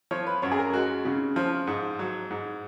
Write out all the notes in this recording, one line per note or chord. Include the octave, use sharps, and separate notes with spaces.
F3 C#5
B4
F#2 C#5
G#4
A#4
G#3 F#4
C#3
F3
G#2
F#3
G#2